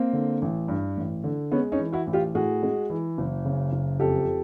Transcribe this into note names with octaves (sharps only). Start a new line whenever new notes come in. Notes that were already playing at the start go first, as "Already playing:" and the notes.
Already playing: A#3 C4
D3
A1
G2
A1
D3
G#3 B3 C#4
C#4 D#4
E3
E4 F#4
A1
F4 G4
A2 F#4 G#4
G#3
E3
F#1
C#3
F#1
F2 G4 A4